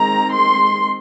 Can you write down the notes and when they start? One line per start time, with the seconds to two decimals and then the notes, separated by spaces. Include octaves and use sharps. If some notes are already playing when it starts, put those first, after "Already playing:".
Already playing: D#3 G#3 C4 A#5
0.33 C6